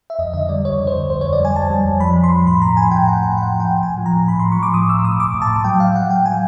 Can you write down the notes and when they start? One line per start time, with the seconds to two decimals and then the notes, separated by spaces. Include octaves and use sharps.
0.10 E5
0.19 F2 D#5
0.34 D3 D#5
0.49 G3 D5
0.65 F2 C#5
0.79 D3
0.87 C5
0.95 F2
1.09 F2 C5
1.21 F2 C#5
1.33 D5
1.40 G3 G#5
1.55 F2 A5
1.70 G3
1.85 F2
2.00 F3 B5
2.16 F3
2.24 C6
2.32 F3
2.47 A2 B5
2.61 A2 A#5
2.77 F3 G#5
2.91 A2 G5
3.07 A2 F#5
3.22 A2 F#5
3.37 A2 F#5
3.53 F3
3.60 G5
3.67 A2
3.83 A2 G#5
3.98 F3
4.06 A#5
4.13 A2
4.28 A2 B5
4.39 F3 C6
4.52 C#6
4.58 F3 D6
4.74 A2 D#6
4.89 A2 E6
5.04 A2 D#6
5.19 A2 D6
5.34 A2
5.42 A5
5.50 A2
5.64 F#3 G5
5.80 A2 F5
5.95 F#3 F#5
6.10 F#3 G5
6.25 F#3 G#5